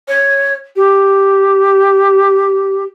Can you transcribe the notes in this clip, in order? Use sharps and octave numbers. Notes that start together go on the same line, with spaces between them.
C#5
G4